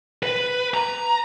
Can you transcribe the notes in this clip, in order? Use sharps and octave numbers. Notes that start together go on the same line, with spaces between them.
B4
A#5